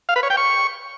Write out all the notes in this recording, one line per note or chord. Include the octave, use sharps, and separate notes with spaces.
F5
B4
C#5
G5
C#6